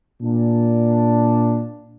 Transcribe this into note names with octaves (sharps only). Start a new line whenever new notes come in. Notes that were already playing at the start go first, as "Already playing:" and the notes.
A#2 D4